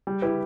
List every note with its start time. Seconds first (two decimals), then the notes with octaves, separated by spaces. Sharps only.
0.07 G3
0.22 E4 G4 B4